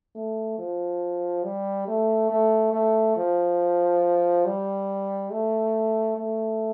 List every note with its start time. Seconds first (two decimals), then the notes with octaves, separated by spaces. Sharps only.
0.15 A3
0.58 F3
1.44 G3
1.88 A3
2.30 A3
2.73 A3
3.17 F3
4.46 G3
5.32 A3
6.18 A3